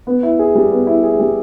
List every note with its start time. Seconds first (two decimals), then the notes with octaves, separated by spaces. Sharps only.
0.07 B3
0.23 E4
0.39 G#4
0.55 G3
0.71 B3
0.87 E4
1.03 G#4
1.19 G3